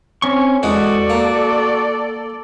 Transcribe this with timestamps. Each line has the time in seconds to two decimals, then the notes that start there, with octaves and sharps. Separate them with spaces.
0.22 C4 C#4 C#6
0.63 E2 G#2 G#3 F#4 A4 D5
1.10 A#3